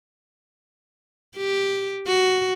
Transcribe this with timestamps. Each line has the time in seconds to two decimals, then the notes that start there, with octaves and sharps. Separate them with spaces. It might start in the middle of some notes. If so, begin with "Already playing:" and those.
1.37 G4
2.07 F#4